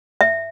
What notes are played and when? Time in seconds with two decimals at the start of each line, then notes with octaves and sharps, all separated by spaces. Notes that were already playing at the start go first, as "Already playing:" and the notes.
0.21 E5